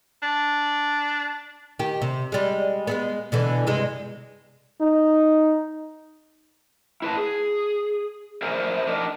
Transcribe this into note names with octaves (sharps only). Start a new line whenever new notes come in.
D4
D#3 G4
C3
G3 G#3
G#3 A3 B3
B2 D3 E3
G2 C3 G#3
D#4
E4 B4 A5
G#4
A#4 C5 D5 E5 G#5 A#5
D4 A#4 D#5